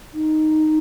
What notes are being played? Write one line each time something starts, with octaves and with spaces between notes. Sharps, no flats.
D#4